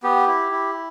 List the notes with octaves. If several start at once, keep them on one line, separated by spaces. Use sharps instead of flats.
B3 G4
E4
E4